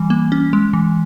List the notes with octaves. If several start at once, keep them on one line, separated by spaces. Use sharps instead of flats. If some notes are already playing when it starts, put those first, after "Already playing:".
Already playing: E3 G3
A#3
C#4
G#3
E3